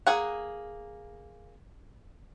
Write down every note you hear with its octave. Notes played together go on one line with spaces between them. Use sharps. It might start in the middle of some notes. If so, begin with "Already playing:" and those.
A#3 G#4 F#5